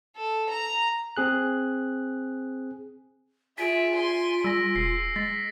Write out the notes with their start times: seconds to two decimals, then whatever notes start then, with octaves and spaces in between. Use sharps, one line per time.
0.16 A4
0.49 A#5
1.17 C4 G#4 F#6
3.58 F4 G#4 E5 B6 D7
3.94 G#5 C6
4.44 G3 G#4 E6 A#6
4.76 E1 E6 C7
5.16 G#3 A6 B6